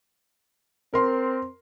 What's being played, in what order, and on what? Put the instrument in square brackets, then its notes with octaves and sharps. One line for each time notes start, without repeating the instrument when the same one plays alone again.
[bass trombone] C4 [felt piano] A#4 C6